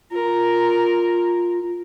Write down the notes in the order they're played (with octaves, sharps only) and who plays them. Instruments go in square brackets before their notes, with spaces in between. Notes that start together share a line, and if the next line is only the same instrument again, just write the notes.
[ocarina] F4 [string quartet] A#4